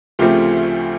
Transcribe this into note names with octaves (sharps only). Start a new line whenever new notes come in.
D2 C#3 F3 A3 C4 F4 G4